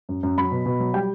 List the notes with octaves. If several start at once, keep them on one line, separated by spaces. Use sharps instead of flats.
F#2
F#2
F#3 B5
B2
B2
F#3
G3 G5